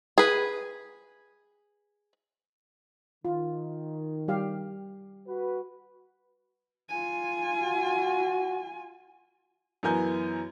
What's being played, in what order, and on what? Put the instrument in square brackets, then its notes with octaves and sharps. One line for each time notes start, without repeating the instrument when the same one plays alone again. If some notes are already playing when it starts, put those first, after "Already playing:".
[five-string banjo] G#4 B4
[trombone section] D#3 [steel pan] F4
[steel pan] G3 G4 F5
[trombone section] F#4 B4
[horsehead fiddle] F4 G#5
[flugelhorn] F#4
[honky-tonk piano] F#2 E3 B3 A#4 G#5 G6